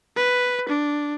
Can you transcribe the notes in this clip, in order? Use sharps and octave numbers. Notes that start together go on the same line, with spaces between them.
B4
D4